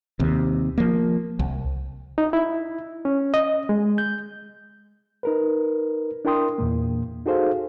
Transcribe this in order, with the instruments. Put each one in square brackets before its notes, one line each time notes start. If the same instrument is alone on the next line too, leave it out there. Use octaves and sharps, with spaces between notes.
[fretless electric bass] D#2 C3
F3 A#3
C2
[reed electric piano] D#4
E4
C#4
D#5
G#3
G6
D#4 A#4 B4
D4 E4 A#4 G5 C6 D#6
E2 A#2 A#3
D#4 F#4 G#4 A4 C5 F5